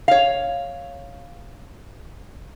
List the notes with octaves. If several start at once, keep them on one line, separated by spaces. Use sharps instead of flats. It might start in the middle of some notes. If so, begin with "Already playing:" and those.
C#5 F5